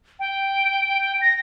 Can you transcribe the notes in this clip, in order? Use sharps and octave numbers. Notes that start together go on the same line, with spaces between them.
G5
A#6